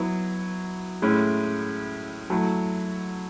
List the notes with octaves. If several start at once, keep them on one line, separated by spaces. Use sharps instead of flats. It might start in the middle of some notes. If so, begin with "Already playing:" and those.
Already playing: F#3 B3 E4
A2 G#3 C#4 E4
F#3 A3 E4